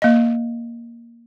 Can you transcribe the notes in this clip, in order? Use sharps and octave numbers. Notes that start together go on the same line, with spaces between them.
A#3 D#5